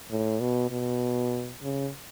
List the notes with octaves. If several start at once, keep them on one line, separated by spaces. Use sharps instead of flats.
A2
B2
B2
C#3